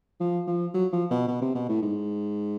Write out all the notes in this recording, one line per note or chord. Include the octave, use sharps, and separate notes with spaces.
F3
F3
F#3
F3
B2
B2
C3
B2
A2
G#2